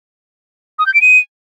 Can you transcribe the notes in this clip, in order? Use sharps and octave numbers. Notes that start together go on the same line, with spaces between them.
D#6
G6
D7
D#7